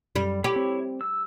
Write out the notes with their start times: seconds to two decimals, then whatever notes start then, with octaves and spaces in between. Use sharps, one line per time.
0.16 F#2 G3
0.44 E4 G4 C#5 B5
0.56 C4
1.01 E6